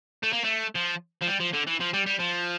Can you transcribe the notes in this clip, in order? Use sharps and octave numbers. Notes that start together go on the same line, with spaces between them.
A3
A#3
A3
F3
F3
G3
F3
D3
E3
F3
G3
G3
F3